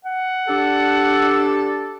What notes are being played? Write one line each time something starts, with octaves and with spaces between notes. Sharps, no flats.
F#5
D4 G4 A4